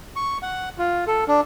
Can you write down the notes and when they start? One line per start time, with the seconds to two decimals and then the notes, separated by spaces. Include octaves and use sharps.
0.16 C#6
0.43 F#5
0.78 F4
1.07 A4
1.28 D4